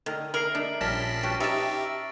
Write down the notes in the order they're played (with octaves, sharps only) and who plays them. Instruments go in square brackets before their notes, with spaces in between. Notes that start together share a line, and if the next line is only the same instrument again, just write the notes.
[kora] D3 A#4 D#5 [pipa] D#3
[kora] G#4 D5 E5 [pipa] A#4 [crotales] C7 D7 F#7
[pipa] D4 [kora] D#4 D#5 E5
[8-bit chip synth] A#1 A5 B6 [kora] G3 C#4 A#4 [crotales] F6 A#6
[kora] C#4 F#4 B4 [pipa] G4 [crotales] C#6 D7
[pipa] D#4 A5 [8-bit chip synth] G4 E5 [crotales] A6